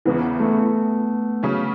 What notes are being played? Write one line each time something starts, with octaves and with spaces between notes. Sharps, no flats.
E2 C#3 E3 B3
A3
C#3 F#3 C#4